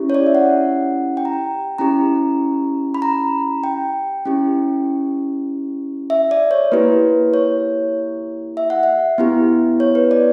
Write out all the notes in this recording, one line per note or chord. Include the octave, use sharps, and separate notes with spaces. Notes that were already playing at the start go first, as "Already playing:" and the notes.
Already playing: C#4 E4 G4
C#5
D5
E5
F#5
G5
A#5
G5
C#4 E4 G4 A#5
B5
A#5
G5
C#4 E4 G4
E5
D5
C#5
A#3 E4 G4 B4
C#5
E5
F#5
E5
B3 E4 G4
C#5
B4
D5